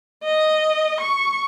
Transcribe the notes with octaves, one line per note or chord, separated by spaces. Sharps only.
D#5
C#6